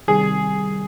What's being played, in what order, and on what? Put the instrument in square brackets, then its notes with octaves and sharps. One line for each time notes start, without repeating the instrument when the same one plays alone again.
[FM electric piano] C3 D#3 G3 [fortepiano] G#4